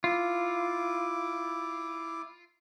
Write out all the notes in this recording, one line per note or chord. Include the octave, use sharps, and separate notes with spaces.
E4 F4 D6